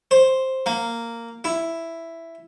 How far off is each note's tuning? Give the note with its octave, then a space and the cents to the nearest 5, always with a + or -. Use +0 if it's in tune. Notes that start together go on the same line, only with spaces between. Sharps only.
C5 +5
A#3 -10
E4 +5